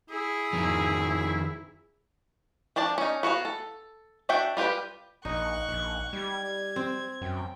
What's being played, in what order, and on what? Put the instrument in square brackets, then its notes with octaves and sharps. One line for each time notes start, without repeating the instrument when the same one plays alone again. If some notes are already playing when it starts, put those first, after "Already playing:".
[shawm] E4 [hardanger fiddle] G#4
[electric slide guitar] F2 D#3 F3
[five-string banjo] F3 D4 D5 A5
C#4 D#4
B3 F#4 C#5 F5
A4
D4 F#4 E5 F#5 G5
G3 F4 G4 B4 G5
[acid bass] A#1 [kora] D#4 [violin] C#6 F#6
[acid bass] A#1
[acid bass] G3 [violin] G#6
[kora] C4
[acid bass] F#2 [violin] G5